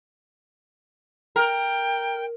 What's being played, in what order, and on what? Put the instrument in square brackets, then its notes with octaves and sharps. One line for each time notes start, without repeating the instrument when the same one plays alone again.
[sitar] A#4 [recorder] G5